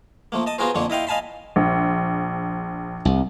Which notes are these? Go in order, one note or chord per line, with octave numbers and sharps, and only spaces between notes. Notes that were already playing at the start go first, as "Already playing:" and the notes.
F3 A3 A#3
D#5 A5 D#6
B3 F4 F#4 G#4 A#4 C5
F2 D3 F3 A#3 C#5 C#6
E4 D#5 F5 G5 C6
D#5 F5 G#5 A5 B5 C6
A#1
C2